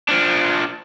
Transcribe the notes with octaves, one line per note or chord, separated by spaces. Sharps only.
F3 D4